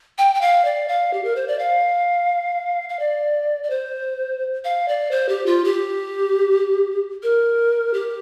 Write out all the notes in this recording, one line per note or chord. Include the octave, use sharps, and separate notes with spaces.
G5
G5
F5
D5
F5
G4
A#4
C5
D5
F5
F5
D5
D5
C5
F5
D5
C5
G4
F4
G4
A#4
G4